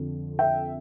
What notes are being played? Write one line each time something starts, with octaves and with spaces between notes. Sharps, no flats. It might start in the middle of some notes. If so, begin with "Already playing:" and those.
Already playing: F2 D3 F3
E5 G5